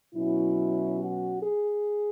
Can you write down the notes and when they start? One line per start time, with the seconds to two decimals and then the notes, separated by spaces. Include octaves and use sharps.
0.14 B2 F#3 C#4 E4
0.99 F#4
1.41 G#4